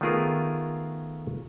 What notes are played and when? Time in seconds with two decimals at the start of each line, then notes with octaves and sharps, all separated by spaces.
0.01 D#3 A3 B3 F4 G#4 A#4